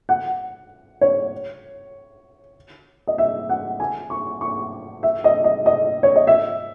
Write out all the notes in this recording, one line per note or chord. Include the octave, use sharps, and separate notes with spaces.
F#5
C#5
D#5
E5
F#5
G#5
C#6
C#6
E5
D#5
D#5
D#5
C#5
D#5
E5